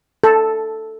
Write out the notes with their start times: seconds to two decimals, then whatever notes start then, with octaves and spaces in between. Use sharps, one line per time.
0.24 A4